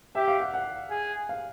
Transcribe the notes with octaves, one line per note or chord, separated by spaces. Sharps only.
G4 E5
F5
F#5
F#5
G#4
F5